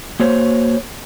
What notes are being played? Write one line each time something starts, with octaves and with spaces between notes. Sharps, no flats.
A#3 F#4 C5 C#5